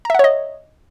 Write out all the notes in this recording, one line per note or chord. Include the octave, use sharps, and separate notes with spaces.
C#5 D#5 E5 F#5 A#5